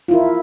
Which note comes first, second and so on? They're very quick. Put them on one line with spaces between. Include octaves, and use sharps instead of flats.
F4 E4 A#4